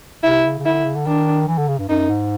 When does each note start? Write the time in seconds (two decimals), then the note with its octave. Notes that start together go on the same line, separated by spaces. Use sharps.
0.23 C3 E4
0.45 C#3
0.59 C#3
0.65 D3 E4
0.84 C#3
0.95 D3
1.06 D#3 D4
1.48 E3
1.58 D3
1.68 C#3
1.78 G2
1.89 F#2 D#4
2.09 G#2